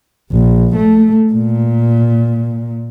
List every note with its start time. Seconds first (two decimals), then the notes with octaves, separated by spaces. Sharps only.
0.32 A#1
0.76 A3
1.33 A#2